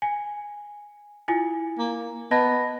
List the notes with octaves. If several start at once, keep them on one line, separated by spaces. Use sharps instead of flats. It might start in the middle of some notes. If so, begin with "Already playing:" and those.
G#5
E4 F4 G#5
A#3
B3 D#5 A5 A#6